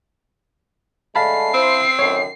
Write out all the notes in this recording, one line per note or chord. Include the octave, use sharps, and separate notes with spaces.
D3 G#3 A3 F5 A5 B5 C7
C4 E4 C5
F#2 A2 D#3 C#5